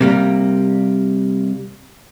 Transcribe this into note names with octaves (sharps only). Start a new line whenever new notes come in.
C3 G3 A#3